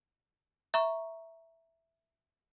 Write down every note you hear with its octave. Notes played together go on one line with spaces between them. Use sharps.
E5 A#5 C#6